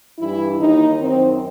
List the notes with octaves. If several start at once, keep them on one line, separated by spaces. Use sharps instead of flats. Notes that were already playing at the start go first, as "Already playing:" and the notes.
G2 E3 E4
D#2 D#3 D#4
F#2 D#3 C4